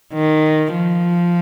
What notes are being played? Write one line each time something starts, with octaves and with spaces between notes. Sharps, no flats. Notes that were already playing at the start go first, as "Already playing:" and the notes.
D#3
F3